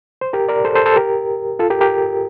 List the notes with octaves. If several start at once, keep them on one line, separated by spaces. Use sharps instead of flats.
C5
G4 A#4
A#4 D5
A4 C5
A4 C5
A4 C5
G4 A#4
F4 A4
G4 A#4
G4 A#4